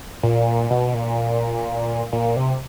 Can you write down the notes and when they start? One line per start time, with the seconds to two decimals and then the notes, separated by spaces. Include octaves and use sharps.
0.23 A#2
0.71 B2
0.94 A#2
2.13 A#2
2.37 C3